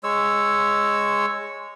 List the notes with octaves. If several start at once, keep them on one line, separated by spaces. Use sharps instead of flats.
G#3 C#5 E6